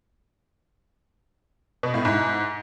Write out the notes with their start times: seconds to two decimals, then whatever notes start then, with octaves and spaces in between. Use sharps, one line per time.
1.83 B2
1.94 A2
2.05 G#2